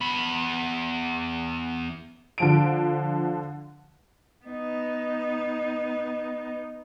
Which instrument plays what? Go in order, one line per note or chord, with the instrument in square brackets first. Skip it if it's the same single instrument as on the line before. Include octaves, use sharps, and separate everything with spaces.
[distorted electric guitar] E2 B5
[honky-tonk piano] D3 F3 D7
[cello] B3 D#4